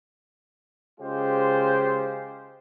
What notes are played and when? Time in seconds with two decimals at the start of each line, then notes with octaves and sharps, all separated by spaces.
1.01 C#3 G#3 F4 G4 G#4 C5